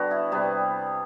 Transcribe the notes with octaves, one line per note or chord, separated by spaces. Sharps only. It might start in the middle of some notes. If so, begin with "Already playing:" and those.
Already playing: D3 G3 B3 F#4
E4
C3 G3 B3